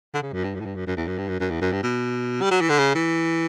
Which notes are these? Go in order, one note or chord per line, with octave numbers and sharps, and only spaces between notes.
D3
C#3
F#2
G2
F#2
A2
G2
F#2
F#2
E2
F#2
G2
F#2
F#2
E2
F#2
G2
B2
G3
F#3
E3
D3
C#3
E3